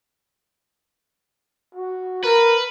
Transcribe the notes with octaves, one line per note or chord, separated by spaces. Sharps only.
F#4
A#4 B4